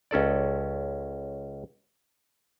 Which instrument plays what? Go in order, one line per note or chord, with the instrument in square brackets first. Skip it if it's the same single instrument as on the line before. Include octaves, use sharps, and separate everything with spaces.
[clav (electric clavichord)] C#2 C#4 A4 D5